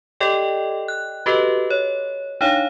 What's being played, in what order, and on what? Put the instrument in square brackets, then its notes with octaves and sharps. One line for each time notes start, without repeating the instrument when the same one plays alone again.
[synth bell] G4 A4 D5 D#5 G5
F#6
F#4 G4 A4 B4 D#5
C#5
D4 D#4 C#5 F5